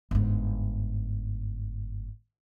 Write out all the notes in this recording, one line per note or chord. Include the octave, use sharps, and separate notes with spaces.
G1 G#2